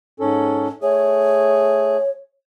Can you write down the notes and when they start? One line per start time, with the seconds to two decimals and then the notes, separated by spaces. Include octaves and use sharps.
0.20 G#2 C#4 A4
0.82 A3 G#4 C#5